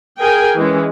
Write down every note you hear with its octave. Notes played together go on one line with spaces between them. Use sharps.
G#4 A#4 G5 G#5
E3 G#3 C#4